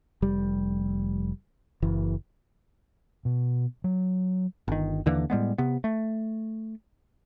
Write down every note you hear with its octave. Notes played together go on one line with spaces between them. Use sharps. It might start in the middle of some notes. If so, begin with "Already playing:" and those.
F1 G3
F#1 E3
B2
F#3
G1 D#3
D#2 D3 E3 A#3
A2 G3 G#3 B3
C3 B3
A3